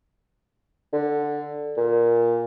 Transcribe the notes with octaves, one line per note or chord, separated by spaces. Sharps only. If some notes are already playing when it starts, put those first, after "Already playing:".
D3
A#2